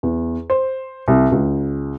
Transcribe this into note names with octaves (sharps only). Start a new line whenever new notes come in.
E2
C5
C2
C#2